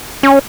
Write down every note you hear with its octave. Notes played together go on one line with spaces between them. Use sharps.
C#4